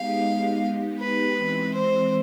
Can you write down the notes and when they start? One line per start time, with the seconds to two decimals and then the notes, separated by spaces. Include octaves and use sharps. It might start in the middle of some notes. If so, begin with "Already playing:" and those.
Already playing: G#3 B3 D#4 G4 F5
0.99 B4
1.37 E3 G#3 C4 E4
1.74 C5